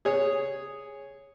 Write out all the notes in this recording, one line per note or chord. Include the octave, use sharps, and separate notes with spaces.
G#4 C#5